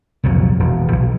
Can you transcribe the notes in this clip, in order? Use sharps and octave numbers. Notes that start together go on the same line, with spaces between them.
C2 F2 A#2 F#3
E1
B1